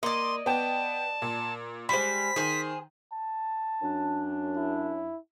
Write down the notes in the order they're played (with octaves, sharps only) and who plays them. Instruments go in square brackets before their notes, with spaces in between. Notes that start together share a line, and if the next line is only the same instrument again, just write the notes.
[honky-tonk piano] A#3 [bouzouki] D5 D#5 [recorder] C6
[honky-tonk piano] B3 G5 [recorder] A5
[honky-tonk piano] A#2
[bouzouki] G3 G#3 [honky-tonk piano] C5 B5 [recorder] B6
[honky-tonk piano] D#3 [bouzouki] G#4 C5
[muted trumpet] A5
[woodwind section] F#2 D4
[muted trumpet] E4